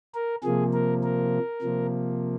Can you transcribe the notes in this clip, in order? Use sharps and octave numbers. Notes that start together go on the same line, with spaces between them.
A#4
C3 F3 A#3 G#4
A#4
A#4
C3 F3 A#3